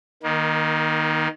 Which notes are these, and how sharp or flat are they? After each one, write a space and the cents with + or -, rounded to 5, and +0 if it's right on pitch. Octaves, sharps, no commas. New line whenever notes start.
D#3 +0 A#3 +35